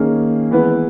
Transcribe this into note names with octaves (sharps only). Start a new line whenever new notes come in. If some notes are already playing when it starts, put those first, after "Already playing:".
Already playing: D#3 A#3 C#4 G#4
E3 G#3 B3 E4 B4